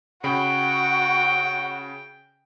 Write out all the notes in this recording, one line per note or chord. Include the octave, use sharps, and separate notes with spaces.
C#3 F#4 G5 B5 D7